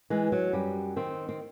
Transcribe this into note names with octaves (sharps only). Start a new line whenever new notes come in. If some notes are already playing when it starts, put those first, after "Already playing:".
E3 G#3
F#3
F#2 G3
D#3 C4
C4